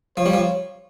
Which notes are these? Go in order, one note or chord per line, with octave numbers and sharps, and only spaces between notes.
F3 C#5
G3
F3